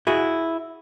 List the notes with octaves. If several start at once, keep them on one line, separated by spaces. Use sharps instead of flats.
E4 F#4 G#4